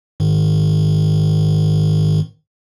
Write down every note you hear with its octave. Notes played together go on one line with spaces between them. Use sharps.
G#2 D#3